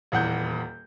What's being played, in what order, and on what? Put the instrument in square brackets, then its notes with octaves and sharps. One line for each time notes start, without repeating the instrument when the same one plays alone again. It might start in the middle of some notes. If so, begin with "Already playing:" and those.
[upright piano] D#1 E2 F#5 G6